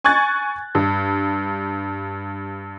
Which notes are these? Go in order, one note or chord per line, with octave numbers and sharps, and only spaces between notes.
G#5 C#6 F#6 G#6 A6
G2